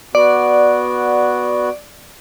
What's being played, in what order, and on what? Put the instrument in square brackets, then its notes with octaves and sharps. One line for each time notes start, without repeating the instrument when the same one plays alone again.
[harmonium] B3 F#4 [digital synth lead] D5